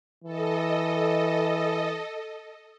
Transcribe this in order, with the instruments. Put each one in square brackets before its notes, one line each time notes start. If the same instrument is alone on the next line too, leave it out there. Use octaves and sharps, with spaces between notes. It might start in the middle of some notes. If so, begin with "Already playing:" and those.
[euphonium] E3 [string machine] A4 D#5